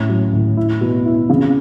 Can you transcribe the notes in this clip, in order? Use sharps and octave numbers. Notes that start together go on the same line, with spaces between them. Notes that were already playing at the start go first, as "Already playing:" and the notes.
Already playing: A2 C#4
F#3
A2
E4
B2
E4
C#3